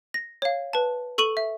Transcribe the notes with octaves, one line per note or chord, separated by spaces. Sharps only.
A#6
C#5 F5
B4 A5
A4 C#6 D#7 F#7
E5